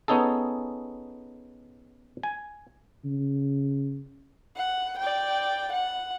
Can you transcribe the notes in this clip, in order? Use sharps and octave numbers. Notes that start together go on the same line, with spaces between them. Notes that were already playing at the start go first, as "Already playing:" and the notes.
B3 C#4 D#4 G#4 A4
G#5
C#3
F#5
D5 G5
F#5